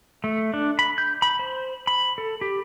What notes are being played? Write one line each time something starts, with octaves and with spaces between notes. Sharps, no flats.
A3
D4
B5
G6
B5
C5
B5
A4
G4